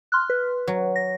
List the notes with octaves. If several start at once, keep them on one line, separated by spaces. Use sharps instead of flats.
C6 F6 F#6
B4
F#3
A#6